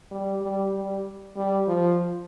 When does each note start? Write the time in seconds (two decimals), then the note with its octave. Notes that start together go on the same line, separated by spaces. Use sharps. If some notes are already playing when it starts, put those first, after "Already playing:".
0.11 G3
0.42 G3
0.73 G3
1.36 G3
1.67 F3